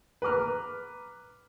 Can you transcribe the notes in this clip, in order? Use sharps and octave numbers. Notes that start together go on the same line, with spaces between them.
B4 A#5 D6 F6